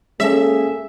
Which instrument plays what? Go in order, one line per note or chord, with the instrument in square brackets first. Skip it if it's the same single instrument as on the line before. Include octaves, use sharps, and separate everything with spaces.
[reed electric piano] G#3 C#4 A4 [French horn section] A#3 G#4 [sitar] E5